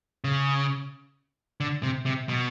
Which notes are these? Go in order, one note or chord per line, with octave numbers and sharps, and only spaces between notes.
C#3
D3
C3
C3
B2